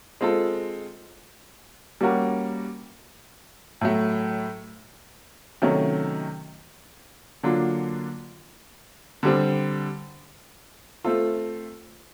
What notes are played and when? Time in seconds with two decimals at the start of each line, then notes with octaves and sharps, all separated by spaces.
0.21 G#3 C4 F4 A4
2.01 G3 A#3 C#4 F#4 A#4
3.81 A2 F#3 A3
5.62 C3 D#3 F#3 A3 C#4
7.43 D3 F#3 A#3 D4 F4
9.23 D3 G3 C4
11.04 A3 C4 F4 A4